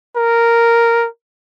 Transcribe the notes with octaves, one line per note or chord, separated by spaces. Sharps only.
A#4